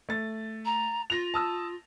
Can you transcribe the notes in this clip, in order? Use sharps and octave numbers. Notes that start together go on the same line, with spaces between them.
A3 A6
A#5
F4 A#6 F7
A5 D#6 E6